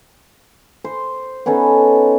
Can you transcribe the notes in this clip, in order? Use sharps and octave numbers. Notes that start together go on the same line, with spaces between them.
C5
B3 C#4 D#4 A4